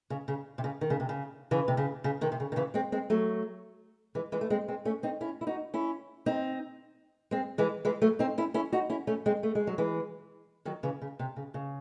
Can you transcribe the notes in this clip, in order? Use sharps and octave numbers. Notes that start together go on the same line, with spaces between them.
C#3
C#3
C3
C#3
D#3
C#3
C3
C#3
C#3 E3
C3
C#3
C#3
C3 D#3
C3
C#3
D#3
C#3 E3
G#3 C4
G#3 C4
F#3 A3
E3 G#3
E3 G#3
A3
G#3 C4
G#3 C4
A3 C#4
C4 D#4
C#4 E4
E4
D#4 F#4
C#4 E4
C4 D#4
G#3 C4
E3 G#3
E3 G#3
F#3 A3
C4 D#4
C#4 E4
C#4 E4
D#4 F#4
C#4 E4
A3 C#4
G#3 C4
A3
G#3
F#3
E3 G#3
D#3 F#3
C#3 E3
C#3
C3
C#3
C#3